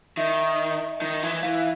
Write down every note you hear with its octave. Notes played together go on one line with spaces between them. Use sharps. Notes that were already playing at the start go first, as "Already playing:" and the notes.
D#3 E5
D#3
E3
E3 F5